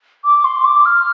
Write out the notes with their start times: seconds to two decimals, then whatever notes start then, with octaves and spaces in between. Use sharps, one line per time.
0.24 D6
0.44 C6
0.64 D6
0.85 F6